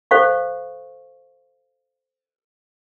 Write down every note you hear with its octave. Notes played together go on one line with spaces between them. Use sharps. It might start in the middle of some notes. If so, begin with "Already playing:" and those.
A4 C5 F5 C#6